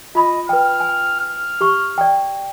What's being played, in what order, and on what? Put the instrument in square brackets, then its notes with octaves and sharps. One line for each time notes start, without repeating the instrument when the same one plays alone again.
[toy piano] F4 B5 [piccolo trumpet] D#5
[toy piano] B4 G5 [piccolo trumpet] F6
[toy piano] G#5
[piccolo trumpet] F6
[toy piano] G4 C#6
D5 G5